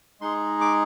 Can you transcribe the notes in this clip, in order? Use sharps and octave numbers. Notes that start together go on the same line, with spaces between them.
G#3 D#4 G#4 C6
D6